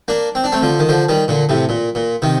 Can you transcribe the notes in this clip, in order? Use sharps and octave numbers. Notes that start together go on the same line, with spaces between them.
A#3 D4
C4
D4
A3 C4
D3 F3
D#3
D3 F3
D#3 G3
A#2 D3
A2 C3
A#2
A#2
C3 D#3